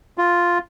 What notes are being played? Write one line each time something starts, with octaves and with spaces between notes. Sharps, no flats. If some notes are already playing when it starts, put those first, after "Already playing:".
F4